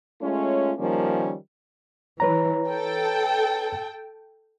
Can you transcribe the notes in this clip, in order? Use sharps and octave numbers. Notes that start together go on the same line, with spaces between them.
G#3 A3 C#4 F4 C#5
D#3 F3 G3 A#3 C#4
E3 B4 C#5 A#5
A4 G5